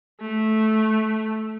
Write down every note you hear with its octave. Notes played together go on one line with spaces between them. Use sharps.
A3